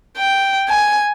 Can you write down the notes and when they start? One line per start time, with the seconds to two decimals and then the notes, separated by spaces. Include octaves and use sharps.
0.18 G5
0.69 G#5